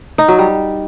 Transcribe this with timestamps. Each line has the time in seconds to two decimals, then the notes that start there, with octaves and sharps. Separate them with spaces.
0.18 D#4
0.28 F#3
0.39 G3